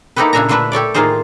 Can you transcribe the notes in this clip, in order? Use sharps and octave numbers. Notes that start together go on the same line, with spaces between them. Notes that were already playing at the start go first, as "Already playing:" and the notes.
A#3 D#4 E4 G4 A4 B4
A#2 C#3 D4 E5 G#5 A#5
A#2 D3 A3 D4 B4 E5
G4 A4 C#5 D5
A2 D#3 A#3 F4 G#4 C5